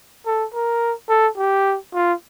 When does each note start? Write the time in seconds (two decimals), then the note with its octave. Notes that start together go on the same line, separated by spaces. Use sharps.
0.26 A4
0.54 A#4
1.09 A4
1.38 G4
1.94 F4